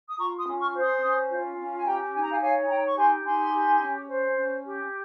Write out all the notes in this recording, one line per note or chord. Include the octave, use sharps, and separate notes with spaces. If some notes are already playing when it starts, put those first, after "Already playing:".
D#6
F4 A#5 C#6
C6 D#6
C#4
C#6 F6
C5
C6 D#6
C#4
F4
C#4
G#5
G4 G5 A#5
D#4 G#5
A#5
F5 G#5
C#5 F5 G#5
G#5
D#4 G5 A#5
C#6
G4 G#5 C6
D#4 G#5 C6
G4
C#4
C5
C#4
G4